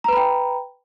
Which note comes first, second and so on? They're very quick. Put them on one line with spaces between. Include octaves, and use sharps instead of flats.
A#5 B4 B5 G5